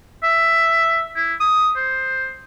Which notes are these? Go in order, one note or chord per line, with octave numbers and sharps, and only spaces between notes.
E5
E4
D#6
C5